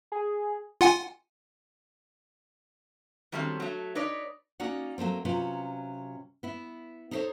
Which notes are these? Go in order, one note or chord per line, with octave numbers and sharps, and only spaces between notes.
G#4
F4 F#5 G#5
D#3 F#3 G3 A3 C4 C#4
F#3 A3
D#4 B4 C#5 D5
A#3 C#4 D#4 F#4 D5 F#5
F#3 A3 A#3 C4
C3 F#3 C#4 F4 B4
B3 E4
D#4 E4 A4 A#4 C5 C#5